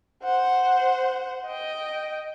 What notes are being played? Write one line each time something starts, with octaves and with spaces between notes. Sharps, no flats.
C5 F#5
D#5 G5